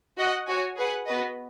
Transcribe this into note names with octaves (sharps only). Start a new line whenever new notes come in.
F#4 D#5 F#5
F#4 C#5 G#5
G#4 B4 F#5
B3 F#4 B4 D#5